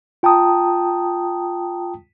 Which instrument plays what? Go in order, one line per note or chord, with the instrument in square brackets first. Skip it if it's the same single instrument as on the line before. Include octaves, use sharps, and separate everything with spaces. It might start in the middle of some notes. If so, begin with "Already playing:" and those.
[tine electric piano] F4 G5 A5 A#5 D#6